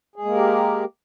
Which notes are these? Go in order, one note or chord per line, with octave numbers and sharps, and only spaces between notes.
G#3 A#3 G4 G#4 A#4